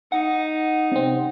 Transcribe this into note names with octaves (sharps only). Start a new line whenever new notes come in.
D#4 F#5
C3 C4